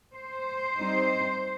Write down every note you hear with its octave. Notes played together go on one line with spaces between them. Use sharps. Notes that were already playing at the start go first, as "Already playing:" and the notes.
C5
G3 C4 D#4